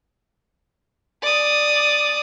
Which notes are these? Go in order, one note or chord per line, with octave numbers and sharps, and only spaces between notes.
D5 D#6